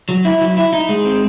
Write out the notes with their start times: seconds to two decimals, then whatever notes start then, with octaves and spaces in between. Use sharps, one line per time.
0.09 F#3
0.25 E4
0.41 F#3
0.57 E4
0.73 D#4
0.89 G#3
1.05 C4